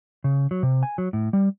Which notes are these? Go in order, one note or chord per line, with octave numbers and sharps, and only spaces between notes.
C#3
F#3
C3
G#5
F#3
A2
G3